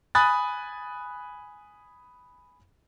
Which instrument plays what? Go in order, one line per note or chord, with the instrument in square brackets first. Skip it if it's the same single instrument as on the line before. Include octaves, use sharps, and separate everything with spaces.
[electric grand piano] G#5 B5 D#6 F#6 A6